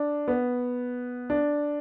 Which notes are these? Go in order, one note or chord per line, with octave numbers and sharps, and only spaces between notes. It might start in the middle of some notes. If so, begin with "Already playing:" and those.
Already playing: D4
B3
D4